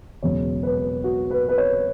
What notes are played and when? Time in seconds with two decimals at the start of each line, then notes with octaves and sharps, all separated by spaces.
0.22 E1 E2 C#3 F#3 C#5
0.63 B4
1.04 F#4
1.31 B4
1.49 B4
1.58 C#5